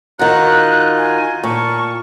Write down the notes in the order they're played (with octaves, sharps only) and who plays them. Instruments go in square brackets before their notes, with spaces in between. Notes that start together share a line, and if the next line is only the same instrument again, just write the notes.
[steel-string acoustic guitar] D#3 F#4 [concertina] D#4 F4 D#5 [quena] F#6
[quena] G#5
[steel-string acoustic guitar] A#2 [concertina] A#4 A5 [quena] C#6